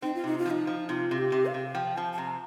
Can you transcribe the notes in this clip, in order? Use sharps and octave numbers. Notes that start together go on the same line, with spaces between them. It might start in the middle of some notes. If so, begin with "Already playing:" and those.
C4 D#4
F4
C3 D#4
F4
F3 D#4
F3
C3 F4
C3
G4
C3
F5
C3
F3 G5
F3 A5
A5
C3 A#5